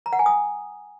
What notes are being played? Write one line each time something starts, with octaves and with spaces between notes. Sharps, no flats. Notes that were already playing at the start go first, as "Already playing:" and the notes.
A#5
F#5
G#5
D#6